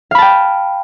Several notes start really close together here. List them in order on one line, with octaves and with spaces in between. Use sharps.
F5 B5 A5 G5